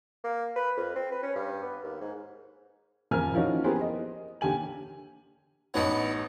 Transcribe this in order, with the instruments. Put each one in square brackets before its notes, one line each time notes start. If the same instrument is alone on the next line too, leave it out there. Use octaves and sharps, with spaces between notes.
[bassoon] A#3
B4
F2
C4
B4
C#4
G2
B3
D#2
G#2
[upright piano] D#1 F2 A#4 G#5 F6
F3 A#3 C#4 D#4 E4 F#4
B3 E4 G4 G#4 A#4 C5
D#5
D#2 D3 G4 G#5 F#7
[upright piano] A1 D#4 C#5 [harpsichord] B3 D4 B4